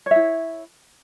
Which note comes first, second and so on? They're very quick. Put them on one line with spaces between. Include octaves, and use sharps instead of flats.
C#5 E5 E4